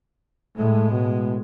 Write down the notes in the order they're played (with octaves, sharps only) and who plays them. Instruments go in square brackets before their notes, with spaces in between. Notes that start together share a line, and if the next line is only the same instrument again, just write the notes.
[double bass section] A2 G#3 [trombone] A3
[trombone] B2